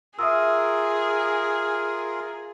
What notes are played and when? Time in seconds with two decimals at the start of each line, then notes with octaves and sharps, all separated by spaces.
0.19 F4 G#4 A#4 E5 D#6 E6